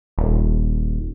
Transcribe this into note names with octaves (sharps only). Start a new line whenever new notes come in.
D#1